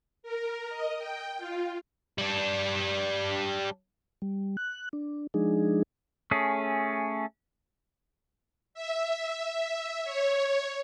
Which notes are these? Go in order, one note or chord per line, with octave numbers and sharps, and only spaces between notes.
A#4
D#5
G5
F4
G3 D4
G3
F#6
D4
F3 G#3 D4 D#4 G#4
A3 C#4 G#4
E5
C#5